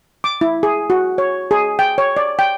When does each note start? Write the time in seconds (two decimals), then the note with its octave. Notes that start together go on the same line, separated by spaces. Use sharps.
0.24 D6
0.41 E4
0.63 G#4
0.90 F#4
1.18 C#5
1.51 G#4
1.79 G5
1.98 C#5
2.17 D5
2.39 G5